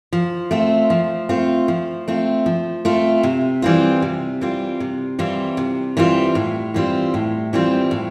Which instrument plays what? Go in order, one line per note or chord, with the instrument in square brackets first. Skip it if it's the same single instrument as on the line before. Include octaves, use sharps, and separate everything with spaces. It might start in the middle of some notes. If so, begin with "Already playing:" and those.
[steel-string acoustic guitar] F3
A3 C4 F4
F3
A3 C4 F4
F3
A3 C4 F4
F3
A3 C4 F4
C3
E3 G3 C4 F4
C3
E3 G3 C4 F4
C3
E3 G3 C4 F4
C3
E3 G3 C4 F4
A2
E3 G3 C4 F4
A2
E3 G3 C4 F4
A2